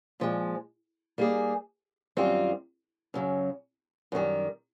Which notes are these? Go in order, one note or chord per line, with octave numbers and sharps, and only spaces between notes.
A#2 F3 G#3
G3 A#3 D#4 G#4
F#2 D#3 G3 C4 F4
F#2 C#3 F#3
F#2 D#3 G3